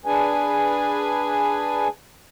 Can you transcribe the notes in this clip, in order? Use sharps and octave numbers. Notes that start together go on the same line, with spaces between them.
D4 G#4 B4 G#5